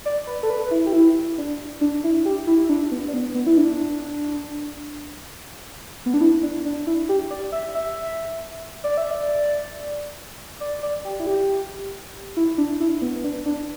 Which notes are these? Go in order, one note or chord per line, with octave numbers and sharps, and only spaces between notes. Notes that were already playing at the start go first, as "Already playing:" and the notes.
D5
B4
A4
B4
E4
G4
E4
D4
D4
E4
G4
E4
E4
D4
B3
D4
B3
B3
E4
D4
B3
D4
E4
D4
D4
E4
G4
D5
E5
E5
D5
E5
D5
D5
D5
G4
E4
G4
E4
D4
E4
B3
B3
D4
D4